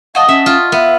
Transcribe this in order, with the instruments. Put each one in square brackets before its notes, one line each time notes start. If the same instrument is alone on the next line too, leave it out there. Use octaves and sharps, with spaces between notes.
[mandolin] F#4 D#5 A5 [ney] F5
[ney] C#4 [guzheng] E5
[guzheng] F4
[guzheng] B3 [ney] E5